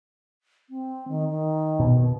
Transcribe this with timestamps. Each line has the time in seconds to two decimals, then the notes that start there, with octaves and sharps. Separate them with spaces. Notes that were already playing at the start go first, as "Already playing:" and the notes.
0.70 C4
1.08 D#3
1.30 D#3
1.80 B2